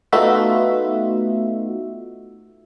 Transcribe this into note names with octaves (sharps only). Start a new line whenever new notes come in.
A3 B3 D#4 F4 F#4 E5